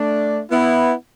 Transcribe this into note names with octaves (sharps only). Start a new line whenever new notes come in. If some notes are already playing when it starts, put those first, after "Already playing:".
Already playing: A3 D4
B3 E4